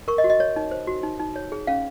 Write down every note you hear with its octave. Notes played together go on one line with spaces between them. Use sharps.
A#4 C#6
D#5
F#4
D#5
C#5
D#4
C5
F#4
D#4
D#4
C#5
G#4
C#4 F5